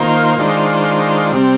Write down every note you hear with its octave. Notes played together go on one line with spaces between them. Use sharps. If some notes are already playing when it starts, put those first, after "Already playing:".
Already playing: D#3 A#3 F4 C5
D#3 G#3 D4 F4 C5
C3 G3 C4